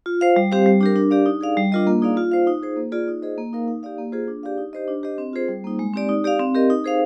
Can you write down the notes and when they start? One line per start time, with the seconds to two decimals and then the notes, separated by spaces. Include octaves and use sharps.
0.06 F4
0.21 C5 F5
0.36 G3
0.52 C4 G4 C5 F5
0.66 G3
0.81 D4 G4 A#4
0.96 D4
1.11 G4 D5 F5
1.26 D#4
1.41 G#4 D5 F5
1.57 G3
1.72 D4 F4 A#4 D#5
1.87 A#3
2.02 D#4 G#4 D5 F5
2.17 F4
2.32 C5 F5
2.47 D#4
2.63 G#4 C5
2.77 A#3
2.92 F4 G#4 D5
3.08 D#4
3.22 G#4 C5 D#5
3.38 A#3
3.53 D#4 A#4 F5
3.68 D#4
3.83 G4 D5 F5
3.98 A#3
4.12 F4 G#4 C5
4.28 D4
4.43 G4 D5 F5
4.58 D#4
4.73 G4 C5 D#5
4.88 D4
5.03 G4 C5 D#5
5.18 C4
5.33 F4 G#4 C5
5.49 G3
5.64 A#3 D#4
5.79 G#3
5.93 C4 D#4 G4 D5
6.09 D#4
6.24 G4 D5 F5
6.39 C4
6.55 G4 A#4 D#5
6.70 D#4
6.84 G#4 C5 F5